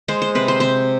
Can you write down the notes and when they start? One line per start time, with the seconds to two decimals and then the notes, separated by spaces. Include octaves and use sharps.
0.08 G#3 C5
0.22 C5
0.35 C3 B4
0.48 C5
0.60 C3 C5